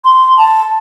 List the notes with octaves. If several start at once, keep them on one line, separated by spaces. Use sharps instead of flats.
C6
A5